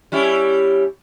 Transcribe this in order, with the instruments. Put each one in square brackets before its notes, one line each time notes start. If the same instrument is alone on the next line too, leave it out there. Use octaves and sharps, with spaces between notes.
[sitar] G3 C#4 E4